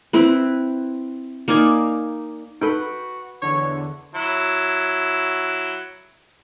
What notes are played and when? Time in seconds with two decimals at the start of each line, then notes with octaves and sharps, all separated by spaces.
0.13 C4 E4 B4
1.48 A#3 D#4 D5 G#5
2.61 D#4 F#4 A4 B4 G5
3.42 E2 D3 C#5
4.14 F#3 E4